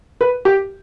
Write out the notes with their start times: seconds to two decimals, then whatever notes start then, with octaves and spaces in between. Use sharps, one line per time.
0.21 B4
0.45 G4